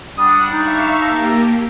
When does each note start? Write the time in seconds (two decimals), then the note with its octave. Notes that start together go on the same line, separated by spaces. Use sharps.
0.18 G3 D4 F#5 D#6
0.52 D#4 E5 F5 C#6
1.01 A#3 G4 E5 A5 A#5